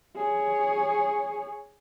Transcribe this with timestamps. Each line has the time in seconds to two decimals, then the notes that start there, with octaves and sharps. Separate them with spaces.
0.15 G#4 C#5